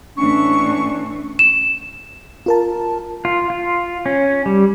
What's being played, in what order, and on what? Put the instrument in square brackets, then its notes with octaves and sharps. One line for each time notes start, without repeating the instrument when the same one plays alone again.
[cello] A2 E3 [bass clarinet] C#4 [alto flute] D4 [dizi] C#6
[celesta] E7
[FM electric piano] F4 A#4 A5
[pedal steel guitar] F4
F4
C#4
G3